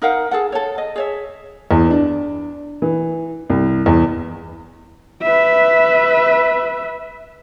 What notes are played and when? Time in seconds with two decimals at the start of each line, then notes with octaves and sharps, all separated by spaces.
0.02 D#4 A#4 F5 F#5
0.31 G#4 A4 F#5
0.52 A4 C#5
0.78 D#5
0.96 G#4 C#5 E5
1.71 E2
1.91 D4
2.82 E3
3.50 C2
3.86 E2
5.23 B4 E5